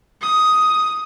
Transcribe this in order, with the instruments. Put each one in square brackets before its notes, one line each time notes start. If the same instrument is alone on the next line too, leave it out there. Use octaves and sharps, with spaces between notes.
[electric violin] D#6